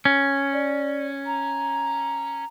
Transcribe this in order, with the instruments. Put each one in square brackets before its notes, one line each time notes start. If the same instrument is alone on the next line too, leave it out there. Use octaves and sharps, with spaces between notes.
[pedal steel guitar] C#4
[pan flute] D5
A#5